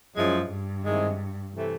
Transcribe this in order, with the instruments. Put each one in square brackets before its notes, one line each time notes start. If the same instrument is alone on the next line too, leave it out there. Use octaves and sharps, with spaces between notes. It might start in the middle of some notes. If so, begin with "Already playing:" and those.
[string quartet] F#2 [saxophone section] F3 G#3 C#4 E4
[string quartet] G2
[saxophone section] D#3 G#3 C4 E4
C3 E3 A3